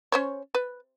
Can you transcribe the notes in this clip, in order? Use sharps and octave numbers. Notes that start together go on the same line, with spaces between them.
C#4 C5 C#5
B4